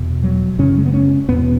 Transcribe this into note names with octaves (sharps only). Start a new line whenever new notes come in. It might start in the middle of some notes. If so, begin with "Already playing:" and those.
Already playing: E2 B2
F#3
F#2 C#3 C#4
G#3
B3
C#4
E2 B2 B3